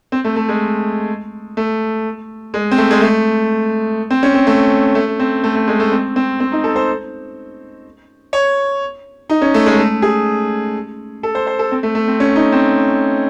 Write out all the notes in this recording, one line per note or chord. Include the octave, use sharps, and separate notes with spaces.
C4
A3
A3
G#3
A3
G#3
C4
A3
G#3
A3
C4
C#4
C4
A3
A3
C4
A3
A3
G#3
A3
C4
C4
C4
D#4
A4
C5
C#5
D#4
C#4
A3
G#3
A3
G#4
A4
C5
C5
A4
C4
A3
A3
C4
C#4
D#4
C4